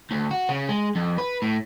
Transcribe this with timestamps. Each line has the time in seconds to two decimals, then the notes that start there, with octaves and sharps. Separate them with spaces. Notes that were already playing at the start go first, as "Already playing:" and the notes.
0.11 D2
0.31 F#4
0.49 C#3
0.69 G#3
0.95 F2
1.18 B4
1.42 A2